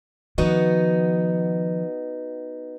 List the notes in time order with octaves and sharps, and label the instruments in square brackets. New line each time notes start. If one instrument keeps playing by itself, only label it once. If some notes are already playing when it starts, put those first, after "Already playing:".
[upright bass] D#3 F3 [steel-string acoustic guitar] B3 D#4 F#4